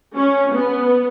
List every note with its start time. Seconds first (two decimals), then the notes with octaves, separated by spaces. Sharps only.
0.16 C#4
0.53 B3